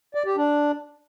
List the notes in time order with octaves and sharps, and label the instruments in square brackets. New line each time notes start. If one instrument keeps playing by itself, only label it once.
[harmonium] D5
G4
D4